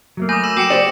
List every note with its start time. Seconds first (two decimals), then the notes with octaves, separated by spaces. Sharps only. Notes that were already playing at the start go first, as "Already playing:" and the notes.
0.17 F#3 A3 A#3
0.29 G#5 B5 D6 D#6 G6 A#6
0.44 E6 D#7 E7
0.57 F#4 G5 D6 C7 C#7 E7
0.70 G4 C5 D5 F#7